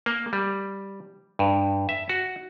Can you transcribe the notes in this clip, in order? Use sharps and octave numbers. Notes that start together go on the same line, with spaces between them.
A#3
G3
G2
E5
F#4